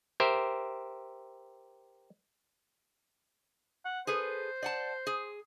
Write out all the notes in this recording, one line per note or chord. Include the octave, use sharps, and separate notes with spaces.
G4 A#4 C5 E5
F#5
G#4 A4 B4 C5
D5 F#5 A5
G#4